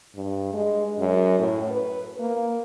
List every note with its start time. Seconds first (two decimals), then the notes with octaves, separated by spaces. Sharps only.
0.15 G2
0.53 G#3
0.99 F#2
1.39 A2
1.71 B4
2.20 A#3